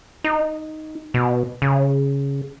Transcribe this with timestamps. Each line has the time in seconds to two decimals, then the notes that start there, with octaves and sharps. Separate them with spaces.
0.24 D#4
1.14 B2
1.62 C#3